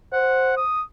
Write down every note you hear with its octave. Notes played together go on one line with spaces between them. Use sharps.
C5 F#5
D#6